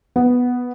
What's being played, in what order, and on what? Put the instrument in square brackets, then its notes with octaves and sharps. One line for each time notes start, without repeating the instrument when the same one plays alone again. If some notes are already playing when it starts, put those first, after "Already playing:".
[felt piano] B3